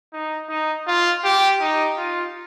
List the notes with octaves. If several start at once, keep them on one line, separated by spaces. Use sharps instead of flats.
D#4
D#4
F4
G4
D#4
F4